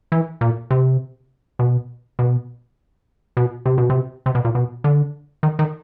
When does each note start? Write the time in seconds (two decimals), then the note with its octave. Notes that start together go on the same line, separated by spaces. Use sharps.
0.12 E3
0.41 A#2
0.71 C3
1.59 B2
2.19 B2
3.37 B2
3.66 C3
3.78 B2
3.90 C3
4.26 C3
4.35 B2
4.45 A#2
4.55 B2
4.84 D3
5.43 D#3
5.59 D#3